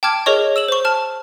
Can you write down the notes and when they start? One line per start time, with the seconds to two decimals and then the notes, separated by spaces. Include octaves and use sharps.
0.03 G5 A5 D6 F6 G#6
0.26 G#4 A#4 C#5 D#5 C#6
0.56 E6 E7 F#7
0.68 C5 C#6
0.85 A5 F6